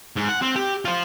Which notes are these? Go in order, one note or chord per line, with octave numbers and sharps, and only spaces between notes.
G#2
F#5
C4
G4
F4 C5